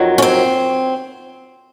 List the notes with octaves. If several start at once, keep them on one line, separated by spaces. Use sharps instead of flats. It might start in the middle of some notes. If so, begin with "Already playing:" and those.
Already playing: F2 D#3 F#3
C#4
C4